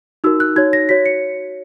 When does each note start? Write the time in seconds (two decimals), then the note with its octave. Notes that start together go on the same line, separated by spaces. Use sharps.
0.24 D#4 F#4 A#4 E6
0.40 F#6
0.56 D#4 F#4 C#5 G#6
0.73 A#6
0.89 F#4 C#5 B6
1.06 C#7